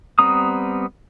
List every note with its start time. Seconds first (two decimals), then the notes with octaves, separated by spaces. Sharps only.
0.19 G3 B3 C4 A#5 D#6